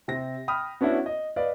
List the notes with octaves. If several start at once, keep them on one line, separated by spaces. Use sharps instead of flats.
C3 C4 A#6
G5 B5 D#6 F6
B3 C#4 D4 E4 F#4
D#5
B4 D5 D#5 F5